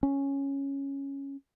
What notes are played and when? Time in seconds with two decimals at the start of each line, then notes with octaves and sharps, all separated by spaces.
0.03 C#4